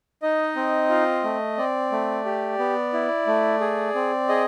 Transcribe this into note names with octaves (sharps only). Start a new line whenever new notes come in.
D#4 D#5
C4
F4
A3
C4 D5
A3
G4
B3
E4
A3
G#4
C4
G#4 D#5